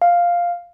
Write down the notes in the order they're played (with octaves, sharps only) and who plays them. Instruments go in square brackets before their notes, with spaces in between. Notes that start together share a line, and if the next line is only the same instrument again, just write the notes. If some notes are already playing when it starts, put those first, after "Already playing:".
[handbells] F5